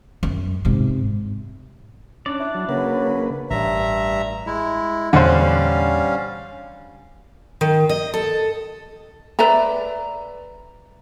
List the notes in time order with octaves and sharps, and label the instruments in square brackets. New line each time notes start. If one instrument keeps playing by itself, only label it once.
[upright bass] F#2
G#2 C3
[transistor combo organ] C#4 [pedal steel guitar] D4 D5
[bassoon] E4
[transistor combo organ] F#3
[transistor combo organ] C#3 A#3 B4 [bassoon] F#3
[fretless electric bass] A1 [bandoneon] G2 E5 A#5
[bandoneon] G#3 E4
[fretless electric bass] E2 A#2 [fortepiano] D3 C5 [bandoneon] G3 C#4 F5
[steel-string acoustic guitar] D#3
D#5
A4
[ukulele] B4 D5 E5 A#5